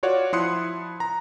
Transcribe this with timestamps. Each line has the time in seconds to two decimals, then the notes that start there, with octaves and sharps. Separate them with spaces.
0.03 F4 F#4 C#5 D5 F#5
0.33 F3 E4 C6 D#6 F#6 C#7
1.00 A#5